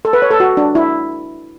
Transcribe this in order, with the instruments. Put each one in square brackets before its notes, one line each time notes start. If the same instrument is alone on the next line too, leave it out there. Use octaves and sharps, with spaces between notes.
[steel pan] A4
B4
C#5
A4
F#4
D4
E4